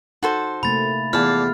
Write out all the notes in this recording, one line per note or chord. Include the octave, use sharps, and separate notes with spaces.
D#4 F#4 A4 C5
C3 A3 A#3 B5 A6
E2 F4 D5 F5 A5 F6